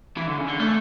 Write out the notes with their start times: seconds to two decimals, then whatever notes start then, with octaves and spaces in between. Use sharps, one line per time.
0.17 E3
0.27 D3
0.38 C#3
0.48 D3
0.59 A3